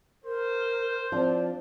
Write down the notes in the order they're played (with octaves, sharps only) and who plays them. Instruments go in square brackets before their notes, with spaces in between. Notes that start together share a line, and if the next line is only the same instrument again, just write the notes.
[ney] A#4 [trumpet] C5
[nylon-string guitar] F3 C4 D4 [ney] D5